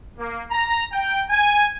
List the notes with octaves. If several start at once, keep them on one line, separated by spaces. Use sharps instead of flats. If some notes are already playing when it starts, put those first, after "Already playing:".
A#3
A#5
G5
G#5